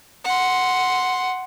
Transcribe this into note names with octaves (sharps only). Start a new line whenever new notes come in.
F#5 C6